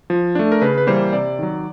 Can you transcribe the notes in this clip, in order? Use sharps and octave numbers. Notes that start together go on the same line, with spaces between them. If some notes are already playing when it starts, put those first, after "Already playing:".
F3
A3 D4
A#4
C#3 B4
B4
E3 G3 A#3 C5
C3 D5
D#3 F#3